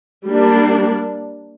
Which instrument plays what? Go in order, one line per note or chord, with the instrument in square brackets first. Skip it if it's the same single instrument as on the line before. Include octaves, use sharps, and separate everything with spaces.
[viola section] G3 A#3 D4